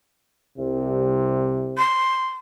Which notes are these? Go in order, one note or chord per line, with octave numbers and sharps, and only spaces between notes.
C2 C3
C6